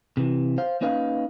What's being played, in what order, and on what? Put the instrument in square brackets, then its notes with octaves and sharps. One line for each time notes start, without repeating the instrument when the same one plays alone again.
[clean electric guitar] C3 E3
C5 F5
A#3 C#4 D#4 B4 D#5 F5